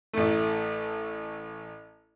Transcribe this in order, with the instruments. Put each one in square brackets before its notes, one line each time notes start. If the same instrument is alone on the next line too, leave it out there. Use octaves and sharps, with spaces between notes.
[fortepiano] A1 A3